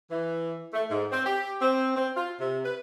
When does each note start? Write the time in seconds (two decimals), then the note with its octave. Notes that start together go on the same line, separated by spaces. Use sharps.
0.11 E3
0.74 A3
0.90 G#2
1.12 C4
1.26 G4
1.62 C4
1.96 C4
2.17 F4
2.40 C3
2.64 B4